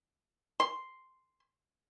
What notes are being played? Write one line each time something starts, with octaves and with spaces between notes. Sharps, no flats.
C6